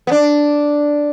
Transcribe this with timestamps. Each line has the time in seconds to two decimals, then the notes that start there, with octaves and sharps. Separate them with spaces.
0.07 B3
0.11 D4